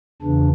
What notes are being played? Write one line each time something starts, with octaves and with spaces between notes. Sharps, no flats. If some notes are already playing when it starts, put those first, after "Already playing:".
E2 C#3 E3 D4